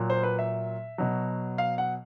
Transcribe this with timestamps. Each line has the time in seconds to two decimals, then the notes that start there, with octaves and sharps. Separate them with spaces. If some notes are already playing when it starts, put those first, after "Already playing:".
Already playing: A#2 F#3
0.10 C5
0.23 B4
0.39 E5
0.98 B2 F#3
1.58 F5
1.78 F#5